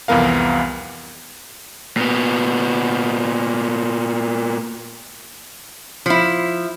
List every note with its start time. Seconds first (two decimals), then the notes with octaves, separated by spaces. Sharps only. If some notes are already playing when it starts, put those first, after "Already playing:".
0.08 C2 F2 E3 B3 A#4 F5
1.97 A#2 B3
6.06 F3 E4